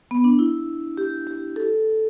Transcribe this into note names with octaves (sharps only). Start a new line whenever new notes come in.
B3
D4
E4
G4
G4
A4